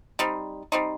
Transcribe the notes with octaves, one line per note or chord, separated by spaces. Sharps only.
G3 C4 D#4
G3 C4 D#4